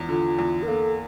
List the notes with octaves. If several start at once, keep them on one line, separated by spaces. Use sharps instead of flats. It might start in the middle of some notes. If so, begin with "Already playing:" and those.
Already playing: E2 F3
D3 F4
E2
A#4
A#3 A4